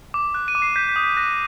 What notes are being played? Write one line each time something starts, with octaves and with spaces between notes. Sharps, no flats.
D6
F#6
D#7
D6
C7
G6 B6
B6
D#6
B6
F#6 A#6